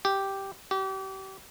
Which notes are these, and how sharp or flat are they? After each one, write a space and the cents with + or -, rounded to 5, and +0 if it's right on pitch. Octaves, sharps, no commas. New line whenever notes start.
G4 -5
G4 -35